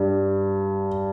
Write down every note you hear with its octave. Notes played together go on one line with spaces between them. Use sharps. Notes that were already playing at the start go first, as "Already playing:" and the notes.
Already playing: G2